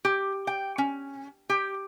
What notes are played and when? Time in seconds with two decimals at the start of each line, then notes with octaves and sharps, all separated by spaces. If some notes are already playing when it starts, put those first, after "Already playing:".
0.05 G4
0.47 G5
0.78 C#4
1.49 G4